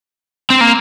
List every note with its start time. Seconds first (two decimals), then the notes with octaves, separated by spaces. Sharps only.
0.50 C4
0.61 A#3